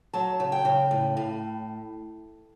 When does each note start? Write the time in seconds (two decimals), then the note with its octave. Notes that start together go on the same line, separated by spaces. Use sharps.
0.13 F#3 A5
0.40 C#3
0.52 G5
0.65 C#3
0.91 A2
1.17 A2